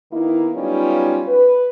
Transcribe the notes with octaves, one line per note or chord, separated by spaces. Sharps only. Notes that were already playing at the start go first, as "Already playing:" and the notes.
D#3 A#3 B3 D#4 E4
F#3 G3 B3 C#4 D#4 F4
B4